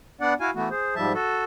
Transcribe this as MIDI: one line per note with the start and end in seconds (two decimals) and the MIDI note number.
0.21 0.34 59
0.21 0.34 62
0.21 0.34 74
0.21 0.34 78
0.40 0.50 64
0.40 0.50 66
0.40 0.50 77
0.40 0.50 80
0.55 0.69 52
0.55 0.69 57
0.55 0.69 59
0.55 0.69 66
0.70 0.95 68
0.70 0.95 72
0.95 1.13 44
0.95 1.13 53
0.95 1.13 55
0.95 1.13 76
0.95 1.13 81
1.14 1.44 66
1.14 1.44 69